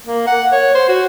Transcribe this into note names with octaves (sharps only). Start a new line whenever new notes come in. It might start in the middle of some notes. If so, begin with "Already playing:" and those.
A#3
F#5
C#5
C5
F#4